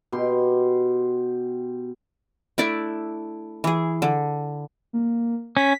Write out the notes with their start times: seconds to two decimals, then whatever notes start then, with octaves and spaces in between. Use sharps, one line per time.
0.12 B2 G4 C6
2.58 A3 D4 E4 D5
3.64 E3 G#4
4.02 D3
4.93 A#3
5.57 C#4 B6